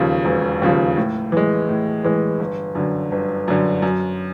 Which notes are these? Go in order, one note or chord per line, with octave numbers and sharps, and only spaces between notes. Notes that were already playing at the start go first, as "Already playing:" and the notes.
Already playing: E1 D#2 C#3 F3
E1
D#2 C#3 F3
A2
E3 G#3
A2
E3 G#3
G1
F#2 D3
G1
F#2 D3
F#2